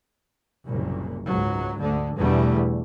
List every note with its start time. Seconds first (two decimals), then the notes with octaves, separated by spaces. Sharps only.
0.65 F#1 C2 A#2
1.27 C#2 G#2 F#3
1.80 D2 D3
2.18 E2 B2 D3 E3 G3 A3